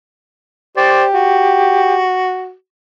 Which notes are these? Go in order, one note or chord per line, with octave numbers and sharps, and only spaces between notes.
G4 C5 D5
F#4